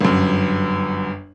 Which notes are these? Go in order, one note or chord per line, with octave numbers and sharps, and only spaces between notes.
G1 F#2